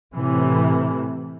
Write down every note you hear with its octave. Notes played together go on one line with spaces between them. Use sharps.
A2 C3 E3